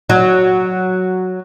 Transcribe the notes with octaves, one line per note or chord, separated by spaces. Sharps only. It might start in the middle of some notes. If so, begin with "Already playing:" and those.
F#3